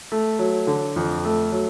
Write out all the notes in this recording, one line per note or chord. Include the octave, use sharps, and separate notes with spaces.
A3
F#3
D3
F2
A3
F#3